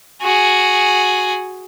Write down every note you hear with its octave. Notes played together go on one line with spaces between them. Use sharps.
F#4 G#4